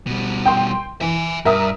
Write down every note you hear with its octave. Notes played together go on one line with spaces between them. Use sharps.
B2 G3
G5 C6
E3 E5 G#5
G2 A#4 E5 D#6